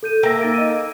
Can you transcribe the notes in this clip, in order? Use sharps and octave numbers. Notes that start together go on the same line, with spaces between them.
A4 G6 D#7
A#3 E5 G5 A#6
D#4 A6 D7
D#5 D#7